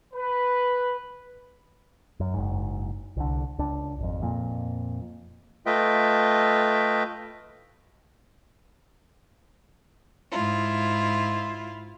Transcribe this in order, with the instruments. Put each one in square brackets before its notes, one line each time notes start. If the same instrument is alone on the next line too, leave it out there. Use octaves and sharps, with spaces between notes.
[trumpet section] B4
[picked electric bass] F#2
F#1 G#2
C2 D3
C#2 D4
G#1 F2
F2 A#2
[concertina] A3 F4 B4 D#5 E5 G5
[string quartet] G#2 E4 F4